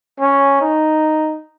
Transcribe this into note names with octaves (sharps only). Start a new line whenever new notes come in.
C#4
D#4